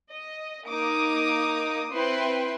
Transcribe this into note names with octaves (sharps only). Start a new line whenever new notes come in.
D#5
A#3 D#4 D6 D#6
C4 E4 B4 E5 G5 C6